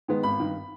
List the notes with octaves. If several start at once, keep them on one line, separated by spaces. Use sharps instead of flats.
D#3 G#3 B3
G#1 B5
G2 D#3